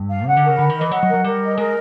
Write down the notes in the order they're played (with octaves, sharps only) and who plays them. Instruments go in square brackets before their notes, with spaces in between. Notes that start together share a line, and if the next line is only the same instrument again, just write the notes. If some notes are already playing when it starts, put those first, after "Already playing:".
Already playing: [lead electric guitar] G2
[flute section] F5
[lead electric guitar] C#3 [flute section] F#5
[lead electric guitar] D3
[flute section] A#4
[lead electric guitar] C#3
[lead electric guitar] D3 [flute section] B5
[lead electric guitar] D#3
[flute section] D#5
[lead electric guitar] E3
[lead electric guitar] F#3 [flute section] F#5
[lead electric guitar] F#3
[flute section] A#4
[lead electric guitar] F#3
[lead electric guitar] G3 [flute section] A#4
[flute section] D#5
[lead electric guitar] G#3 [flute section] A#4